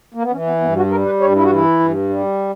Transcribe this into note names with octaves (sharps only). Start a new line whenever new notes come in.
A#3
B3
E3 C#4
B3
G2 B3
F#4
G3 A#4
B4
G2 C#5
E4
F#4
E3 E4
G2
G3